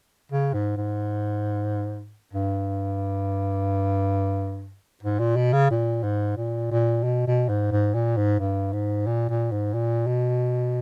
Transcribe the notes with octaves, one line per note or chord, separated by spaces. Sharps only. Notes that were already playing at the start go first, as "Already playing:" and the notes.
C#3
G#2
G#2
G2
G#2
A#2
B2
C#3
A#2
G#2
A#2
A#2
B2
B2
G#2
G#2
A#2
G#2
G2
G#2
A#2
A#2
G#2
A#2
B2